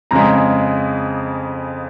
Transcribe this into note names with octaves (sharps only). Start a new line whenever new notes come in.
F2 C#3 G#3 A#5